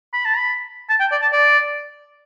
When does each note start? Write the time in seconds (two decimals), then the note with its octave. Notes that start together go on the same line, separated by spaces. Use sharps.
0.14 B5
0.25 A5
0.37 B5
0.90 A5
1.00 G5
1.12 D5
1.22 A5
1.33 D5